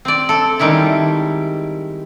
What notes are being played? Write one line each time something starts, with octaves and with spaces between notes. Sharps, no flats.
C4 D5
A4
D#3 G3 G#3 E4